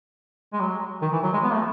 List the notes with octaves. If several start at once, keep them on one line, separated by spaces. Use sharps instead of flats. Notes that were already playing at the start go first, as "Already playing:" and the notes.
G#3
F#3
D#3
E3
F#3
G#3
B3
A3